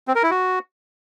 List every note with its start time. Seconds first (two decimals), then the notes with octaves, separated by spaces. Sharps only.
0.08 C4
0.15 A#4
0.23 E4
0.31 F#4